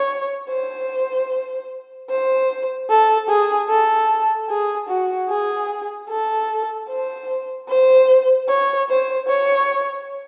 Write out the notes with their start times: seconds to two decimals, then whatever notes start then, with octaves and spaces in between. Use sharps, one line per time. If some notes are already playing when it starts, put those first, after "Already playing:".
Already playing: C#5
0.50 C5
2.10 C5
2.89 A4
3.29 G#4
3.69 A4
4.49 G#4
4.89 F#4
5.29 G#4
6.10 A4
6.89 C5
7.69 C5
8.49 C#5
8.89 C5
9.28 C#5